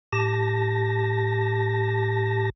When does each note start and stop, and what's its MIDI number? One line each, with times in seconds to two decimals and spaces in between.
0.12 2.50 45
0.12 2.50 67
0.12 2.50 81
0.12 2.50 94